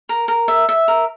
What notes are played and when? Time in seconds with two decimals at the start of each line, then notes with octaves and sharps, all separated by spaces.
0.09 A#4
0.28 A#4
0.48 E5
0.69 E5
0.88 A#4